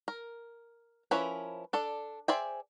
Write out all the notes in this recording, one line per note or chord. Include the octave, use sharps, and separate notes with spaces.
A#4
F3 C#4 E4 A#4 B4
D4 A4 D5
G#4 C5 D5 E5 G5